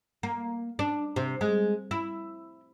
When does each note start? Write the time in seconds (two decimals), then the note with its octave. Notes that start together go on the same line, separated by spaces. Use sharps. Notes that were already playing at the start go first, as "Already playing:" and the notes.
0.23 A#3
0.79 D4
1.16 C3
1.41 G#3
1.91 E4